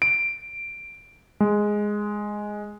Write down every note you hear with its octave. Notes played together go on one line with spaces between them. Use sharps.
D7
G#3